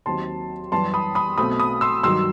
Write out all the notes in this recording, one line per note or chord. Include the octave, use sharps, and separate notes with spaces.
D#2 D#3 F#3 C4 A5 C6
F#2 E3 G3 A5 C6
B5 D#6
B5 D#6
B1 B2 A3 C4 B5 D#6
B5 D#6
C6 E6
G2 D#3 F#3 C6 E6